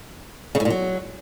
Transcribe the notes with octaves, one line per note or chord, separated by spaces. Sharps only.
C#3
A2
A#2
F#3